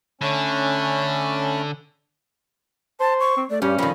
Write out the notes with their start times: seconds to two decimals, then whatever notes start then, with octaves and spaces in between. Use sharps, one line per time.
0.21 D3 A3 C#4 A5 B5
3.00 C5 A5
3.20 C#6
3.37 C4
3.50 A3 D5
3.62 G2 C#4 G4
3.79 F2 D#3 B5